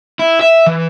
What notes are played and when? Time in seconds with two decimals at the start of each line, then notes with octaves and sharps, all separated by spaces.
0.19 E4
0.41 E5
0.66 E3